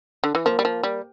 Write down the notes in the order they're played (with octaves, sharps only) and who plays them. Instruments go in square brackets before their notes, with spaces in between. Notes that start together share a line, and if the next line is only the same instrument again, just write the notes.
[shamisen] D3
E3
[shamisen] F3 [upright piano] A#3
[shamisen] G3
F3
G3